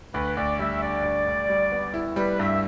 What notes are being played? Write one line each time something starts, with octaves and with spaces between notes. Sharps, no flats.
D2 B4
D2 D5
G3 E5
D4 D5
D2
D2
G3
B3
E4
G3 B4
G2 E5